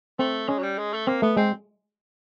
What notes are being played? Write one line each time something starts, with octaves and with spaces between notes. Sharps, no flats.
A3 C4
G#3 C#4
F#3
G3
G#3
A3
A#3 C4
A3 B3
G#3 C4